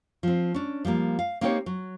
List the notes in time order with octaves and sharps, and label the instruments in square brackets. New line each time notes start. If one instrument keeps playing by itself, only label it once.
[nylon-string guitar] F3 C4
C#4 D4
F3 G3 A3 A#3
F5
A#3 C4 D#4 E4 G4 C#5
F#3